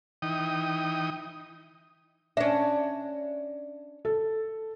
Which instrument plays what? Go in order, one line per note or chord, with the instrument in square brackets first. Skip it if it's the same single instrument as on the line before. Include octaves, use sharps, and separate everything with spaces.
[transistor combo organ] E3 D#4 G5 D#6
[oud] C#4 D4 [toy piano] E5
[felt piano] A4